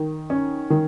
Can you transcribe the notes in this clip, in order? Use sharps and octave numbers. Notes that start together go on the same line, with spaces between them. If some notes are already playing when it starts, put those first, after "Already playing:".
Already playing: D#3
C#4
D#3